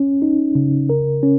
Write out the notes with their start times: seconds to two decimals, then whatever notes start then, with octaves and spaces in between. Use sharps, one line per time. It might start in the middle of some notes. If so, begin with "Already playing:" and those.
Already playing: C#4
0.22 D#4
0.55 C#3
0.90 A#4
1.23 C#4